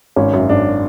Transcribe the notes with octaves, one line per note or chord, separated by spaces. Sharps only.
G#1 C#4
F#2
G#1 D4